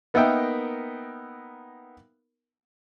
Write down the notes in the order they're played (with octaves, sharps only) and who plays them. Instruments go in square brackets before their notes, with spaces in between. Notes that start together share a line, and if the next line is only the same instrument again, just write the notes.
[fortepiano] A#3 B3 D#4 A#4 E5 G5